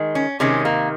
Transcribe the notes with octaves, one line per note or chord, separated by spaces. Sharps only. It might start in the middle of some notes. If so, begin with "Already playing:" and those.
Already playing: D#3 G#3
C#4
C3 D#3 G#3 C#4
A#3